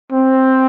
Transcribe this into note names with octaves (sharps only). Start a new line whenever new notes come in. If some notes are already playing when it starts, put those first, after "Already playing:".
C4